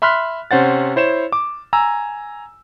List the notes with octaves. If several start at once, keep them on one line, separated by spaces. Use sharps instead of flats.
E5 B5 C6 F6 F#6 B6
C3 C#4 C5 F#5 A6
E4 C5 C#5 E7
D6
G#5 A#5 E6